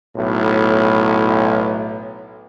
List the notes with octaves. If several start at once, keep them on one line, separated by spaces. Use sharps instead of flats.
B1 A2